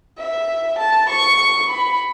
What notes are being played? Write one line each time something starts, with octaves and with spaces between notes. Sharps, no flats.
E5
A5
C#6
B5